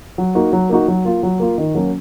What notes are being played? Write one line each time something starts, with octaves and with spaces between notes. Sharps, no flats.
F#3
A#3 D#4 F#4
F#3
A#3 D#4 F#4
F#3
A#3 F4
F#3
A#3 F4
D#3
F#3 A#3 C#4 F#4